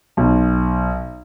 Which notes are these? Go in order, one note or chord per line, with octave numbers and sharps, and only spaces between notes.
B1